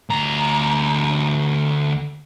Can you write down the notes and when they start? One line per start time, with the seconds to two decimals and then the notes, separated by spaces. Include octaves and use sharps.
0.10 D2 A#5